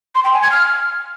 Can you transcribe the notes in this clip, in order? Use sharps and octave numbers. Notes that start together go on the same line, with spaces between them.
C6
G5
G#5
G#6
F6